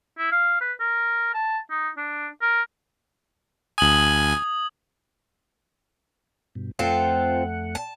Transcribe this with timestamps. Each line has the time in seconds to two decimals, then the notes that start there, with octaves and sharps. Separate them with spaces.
0.18 E4
0.32 F5
0.61 B4
0.80 A#4
1.34 A5
1.70 D#4
1.97 D4
2.41 A#4
3.78 D2 G#5 D#6 G#6 F#7
6.55 G2 B2
6.79 F2 A3 C4 F4 A4 F#5
7.75 A5